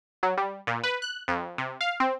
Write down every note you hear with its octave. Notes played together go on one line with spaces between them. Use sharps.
F#3
G3
A#2
B4
F#6
F2
C3
F5
C4